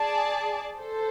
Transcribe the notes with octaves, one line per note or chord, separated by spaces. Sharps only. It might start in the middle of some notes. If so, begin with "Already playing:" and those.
Already playing: G#4 D5 A5
A4 C5